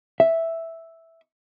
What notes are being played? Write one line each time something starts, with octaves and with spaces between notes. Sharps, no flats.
E5